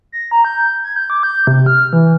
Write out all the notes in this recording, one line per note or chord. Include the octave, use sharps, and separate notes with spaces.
A#6
A#5
G6
G#6
G6
D6
G6
C3
F6
E3